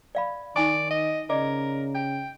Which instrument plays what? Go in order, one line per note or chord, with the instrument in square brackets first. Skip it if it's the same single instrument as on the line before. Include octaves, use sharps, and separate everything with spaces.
[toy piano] D5 F5 B5
[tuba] D#3 [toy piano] D#4 G#5 C#6 [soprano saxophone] D5
[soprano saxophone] D#5
[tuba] C#3 [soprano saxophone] A#4 [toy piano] D5 D#5 D6
[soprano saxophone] G5